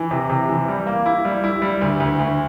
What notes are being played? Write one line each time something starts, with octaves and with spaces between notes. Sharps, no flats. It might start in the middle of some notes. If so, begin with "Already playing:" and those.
Already playing: E3
C3
C3
E3
G3
A#3
E4
G3
E4
G3
D2
D2
D2